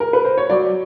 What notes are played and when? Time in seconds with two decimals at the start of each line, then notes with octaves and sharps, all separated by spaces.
0.00 A#4
0.13 B4
0.25 C5
0.38 C#5
0.50 F#3 D5